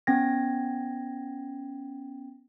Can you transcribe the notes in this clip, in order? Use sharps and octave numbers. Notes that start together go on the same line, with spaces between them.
B3 C#4 G5 G#6 A#6